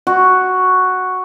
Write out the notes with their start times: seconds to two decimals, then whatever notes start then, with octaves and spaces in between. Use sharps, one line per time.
0.07 F#4